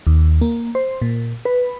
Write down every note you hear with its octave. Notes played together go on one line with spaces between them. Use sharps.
D#2
A#3
C5
A#2
B4